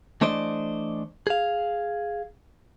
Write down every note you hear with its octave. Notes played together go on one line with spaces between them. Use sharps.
E3 A3 D4 C5 D5 D#5
G#4 F5